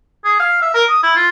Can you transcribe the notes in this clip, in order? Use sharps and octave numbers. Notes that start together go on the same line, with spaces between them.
G#4
F5
E5
A#4
D#6
E4
F4